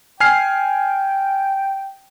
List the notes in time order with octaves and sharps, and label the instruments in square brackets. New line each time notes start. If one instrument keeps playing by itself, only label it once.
[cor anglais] G5 [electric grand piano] G#5 F6 C7